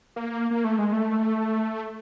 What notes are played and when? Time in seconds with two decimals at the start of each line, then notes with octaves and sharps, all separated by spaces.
0.16 A#3
0.51 A#3
0.64 A3
0.79 G#3
0.92 A3